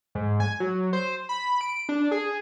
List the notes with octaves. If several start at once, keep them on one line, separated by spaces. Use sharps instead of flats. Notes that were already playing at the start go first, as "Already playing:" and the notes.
G#2
G#5
F#3
C5
B5
D7
D4
G#4